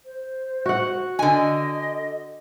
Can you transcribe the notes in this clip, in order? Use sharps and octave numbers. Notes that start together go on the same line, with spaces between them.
C5
F#4 F#5
D3 D#5 G#5